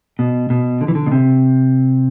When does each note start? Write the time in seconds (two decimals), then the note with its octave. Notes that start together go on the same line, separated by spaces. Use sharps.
0.19 B2
0.50 B2
0.81 D3
0.88 E3
0.95 D3
1.06 B2
1.12 C3